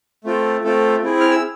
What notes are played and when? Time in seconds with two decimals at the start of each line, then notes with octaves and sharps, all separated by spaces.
0.24 A3 C4 F4 A4
0.64 A3 C4 F4 A4
1.03 C4 E4 G#4
1.20 F6
1.31 E6